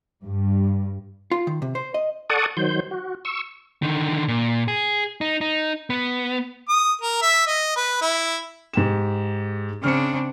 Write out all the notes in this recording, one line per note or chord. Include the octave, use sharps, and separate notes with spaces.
G2
F4
D#3
C3
C5
D#5
A4 D5 F#5 A5 C#6 D#6
D#3 F#3 C5 G6
F#4
C#6 E6
D3 D#3
A#2
G#4
D#4
D#4
B3
D#6
A#4
E5
D#5
B4
E4
G#2 G4 E7
C#3 C4 D4 F6 C#7